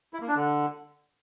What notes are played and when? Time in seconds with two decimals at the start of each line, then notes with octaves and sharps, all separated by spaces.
0.14 E4
0.21 A#3
0.28 D4
0.35 D3